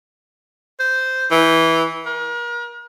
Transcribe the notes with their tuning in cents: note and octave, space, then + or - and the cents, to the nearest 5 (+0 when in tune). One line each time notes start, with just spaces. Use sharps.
C5 -10
E3 -10
A#4 +40